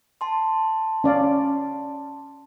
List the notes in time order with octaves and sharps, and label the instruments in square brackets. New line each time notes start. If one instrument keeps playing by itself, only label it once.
[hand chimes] A5 C6
[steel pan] C#4 D5 F5